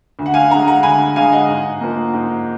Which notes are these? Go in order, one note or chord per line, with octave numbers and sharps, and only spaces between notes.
D2
F#5
F5 G#5
D3 G#3 F#5 A#5
F#5 A#5
D2 G#5 B5
D3 G#3 F5 G#5
D#5 F#5
G#2
F3 A#3
G#2